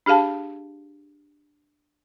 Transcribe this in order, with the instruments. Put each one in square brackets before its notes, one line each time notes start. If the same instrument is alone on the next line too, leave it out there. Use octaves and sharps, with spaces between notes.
[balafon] D4 G4 G#4 F5 A5